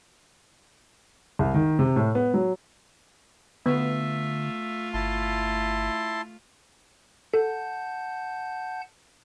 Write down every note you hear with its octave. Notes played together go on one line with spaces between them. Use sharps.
C2
D#3
C3
A2
B3
F#3
D3 A3 B3 F4 E5
G1 E4 A5 C6
A4 F#5 A5 G6